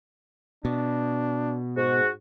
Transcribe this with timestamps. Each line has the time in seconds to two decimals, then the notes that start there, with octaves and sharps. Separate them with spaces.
0.65 B2 D4
1.76 G#2 F#4